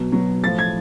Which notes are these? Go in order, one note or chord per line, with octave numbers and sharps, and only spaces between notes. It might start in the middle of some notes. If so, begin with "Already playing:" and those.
Already playing: B2 F#3
B2 F#3
A2 F3 A6
G#6